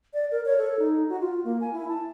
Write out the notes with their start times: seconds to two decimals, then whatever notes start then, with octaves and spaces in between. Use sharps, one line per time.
0.14 D5
0.31 A#4
0.45 C#5
0.58 A4
0.79 D#4
1.09 F#4
1.21 F4
1.44 A#3
1.61 G#5
1.73 E4
1.88 A5